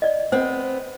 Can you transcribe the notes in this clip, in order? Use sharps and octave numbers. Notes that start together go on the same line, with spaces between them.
D5 D#5
B3 C4 C5